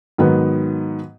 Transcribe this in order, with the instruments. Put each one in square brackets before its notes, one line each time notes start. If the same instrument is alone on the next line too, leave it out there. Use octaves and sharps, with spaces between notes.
[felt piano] G#2 D#3 F#3 B3